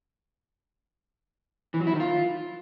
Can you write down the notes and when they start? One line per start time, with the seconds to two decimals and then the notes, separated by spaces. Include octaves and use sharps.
1.74 E3
1.80 F#3
1.87 E4
1.93 D#3
2.00 F4